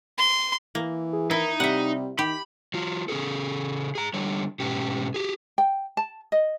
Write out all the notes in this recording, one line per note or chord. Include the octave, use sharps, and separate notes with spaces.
C6
E3 A#3
G#4
D#3 D#4 E4
C3 G3 E5 F#5
D#3 G4 B5
F#3 F4
C#3 C#4 D#4 G#4 A4
G#4 A#5
D3 G3 C#5
G#2 B2 C#4 G4
G4 G#4
G5
A5
D#5